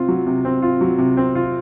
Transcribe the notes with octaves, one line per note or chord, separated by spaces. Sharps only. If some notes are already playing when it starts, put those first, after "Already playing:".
Already playing: C3 C4 F4
F#3
C3
C4
F4
F#3
C3
C4
F4